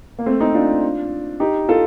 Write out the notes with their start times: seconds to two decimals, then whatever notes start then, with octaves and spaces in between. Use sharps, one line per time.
0.19 A#3
0.26 A3 C4
0.40 C4 D#4
0.54 D4 F4
1.40 D#4 G4
1.69 F4 A4